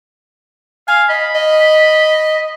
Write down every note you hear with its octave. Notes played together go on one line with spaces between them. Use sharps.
F5 G#5
D#5 B5
D#5